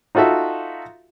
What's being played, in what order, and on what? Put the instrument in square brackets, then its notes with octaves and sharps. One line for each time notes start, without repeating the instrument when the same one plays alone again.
[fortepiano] D#4 F4 F#4 A4 E5